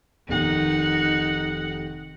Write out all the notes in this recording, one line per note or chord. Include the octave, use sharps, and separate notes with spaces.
F1 D#3 D#4 F#5